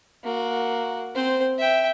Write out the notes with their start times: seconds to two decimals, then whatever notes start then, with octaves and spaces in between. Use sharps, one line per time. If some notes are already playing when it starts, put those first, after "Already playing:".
0.24 A#3 F#4
1.15 C4 C5
1.58 E5 G5